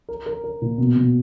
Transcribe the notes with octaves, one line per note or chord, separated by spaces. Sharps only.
A#4
A#4
A#4
A#2
B2
B2